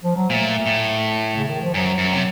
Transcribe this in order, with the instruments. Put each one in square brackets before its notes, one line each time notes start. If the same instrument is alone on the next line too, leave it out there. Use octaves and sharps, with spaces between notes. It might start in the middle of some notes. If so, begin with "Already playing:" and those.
[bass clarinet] F3
F#3
[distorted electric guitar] A#2 [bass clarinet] A3
[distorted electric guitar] A2
[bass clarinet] C#3
D#3
F3
[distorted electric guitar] F#2 [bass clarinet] F#3
[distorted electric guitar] F#2
C3